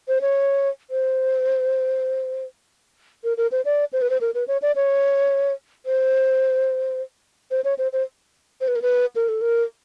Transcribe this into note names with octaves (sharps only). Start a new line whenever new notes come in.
C5
C#5
C5
A#4
A#4
C5
D5
C5
B4
C5
A#4
B4
C#5
D5
C#5
C5
C5
C#5
C5
C5
C5
B4
A#4
B4
A#4
A4
A#4